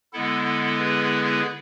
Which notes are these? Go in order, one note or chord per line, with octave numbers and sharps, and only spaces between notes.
D3 G#3 B3 E4 A4
G#4 B4